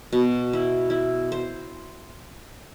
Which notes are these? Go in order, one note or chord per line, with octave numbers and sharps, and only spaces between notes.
B2
E4
E4
C5